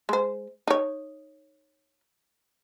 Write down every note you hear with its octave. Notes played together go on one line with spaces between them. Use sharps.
G#3 C5
D#4 C#5